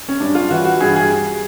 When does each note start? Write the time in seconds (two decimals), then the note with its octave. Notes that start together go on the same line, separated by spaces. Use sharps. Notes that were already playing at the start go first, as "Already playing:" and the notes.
0.09 C#4
0.20 G2 D4
0.35 F4
0.51 E3 F#4
0.65 F#4
0.80 G2 G#4
0.96 G#4